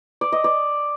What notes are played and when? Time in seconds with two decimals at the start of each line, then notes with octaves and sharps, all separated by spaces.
0.21 D5
0.32 D#5
0.44 D5